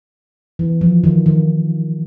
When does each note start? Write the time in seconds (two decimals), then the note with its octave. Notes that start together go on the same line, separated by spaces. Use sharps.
0.59 E3
0.81 F3
1.04 D#3
1.26 D#3